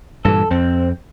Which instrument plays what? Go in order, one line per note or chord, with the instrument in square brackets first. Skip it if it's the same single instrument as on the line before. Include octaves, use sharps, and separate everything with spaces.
[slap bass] G2 A#2 E3 [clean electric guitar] A4
[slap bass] F2 [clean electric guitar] C4